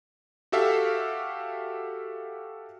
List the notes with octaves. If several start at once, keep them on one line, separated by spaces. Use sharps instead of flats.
F#4 G4 A4 E5 F5